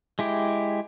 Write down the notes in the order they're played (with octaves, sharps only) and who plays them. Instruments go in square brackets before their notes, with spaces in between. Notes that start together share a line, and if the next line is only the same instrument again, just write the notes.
[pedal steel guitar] G#3 E4 G4